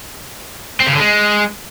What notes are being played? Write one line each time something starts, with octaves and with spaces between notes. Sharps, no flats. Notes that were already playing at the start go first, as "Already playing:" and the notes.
C4
C#3
D3
G#3